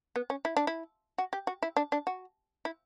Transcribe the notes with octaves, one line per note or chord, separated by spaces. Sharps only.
B3
C#4
E4
D4
E4
F#4
G4
F#4
E4
D4
D4
F#4
E4